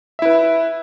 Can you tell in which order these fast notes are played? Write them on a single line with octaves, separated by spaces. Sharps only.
E5 E4 B4